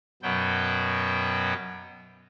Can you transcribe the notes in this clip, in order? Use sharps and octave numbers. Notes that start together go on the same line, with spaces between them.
F#2 B2 F#3 B3 G5